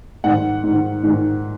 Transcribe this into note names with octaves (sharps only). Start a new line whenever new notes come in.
G#2 D#3 F#5
G#2
D#3
G#2 D#3